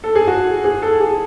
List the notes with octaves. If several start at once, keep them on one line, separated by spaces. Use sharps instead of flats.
A4
G#4
F#4
G#4
A4
G#4